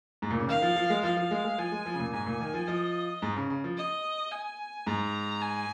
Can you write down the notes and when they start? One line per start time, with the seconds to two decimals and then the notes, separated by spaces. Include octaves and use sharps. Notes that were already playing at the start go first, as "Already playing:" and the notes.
0.22 G#2
0.31 A#2
0.39 C#3
0.48 D#3 F5
0.62 F3
0.76 F3
0.90 G#3
1.03 F3 F5
1.17 F3
1.31 G#3
1.45 G#3
1.58 F3 G#5
1.72 G#3
1.86 F3
1.94 C#3
1.99 A#2
2.13 G#2 G#5
2.26 A#2
2.40 D#3
2.54 F3
2.68 F3 D#5
3.22 G#2
3.36 C#3
3.50 C#3
3.64 F3
3.77 D#5
4.32 G#5
4.87 G#2 A#5
5.41 G#5